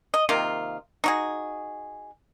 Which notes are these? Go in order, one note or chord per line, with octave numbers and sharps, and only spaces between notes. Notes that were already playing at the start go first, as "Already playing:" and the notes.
D#5
C3 D#3 A#3 F4
D#4 F#4 G#4